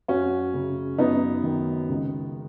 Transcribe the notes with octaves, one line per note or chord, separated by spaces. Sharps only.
F#2 C#4 F#4
C#3
F#2 B3 D#4
D#3
C#2